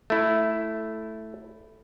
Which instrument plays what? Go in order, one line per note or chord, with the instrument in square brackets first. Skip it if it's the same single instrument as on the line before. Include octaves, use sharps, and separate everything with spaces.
[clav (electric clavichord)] A3 E4